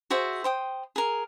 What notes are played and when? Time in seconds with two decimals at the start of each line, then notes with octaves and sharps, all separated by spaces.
0.10 F#4 G#4 C5 E5
0.44 C5 G5 D#6
0.96 G#4 A#4